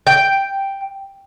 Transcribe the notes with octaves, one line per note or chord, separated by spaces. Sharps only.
G5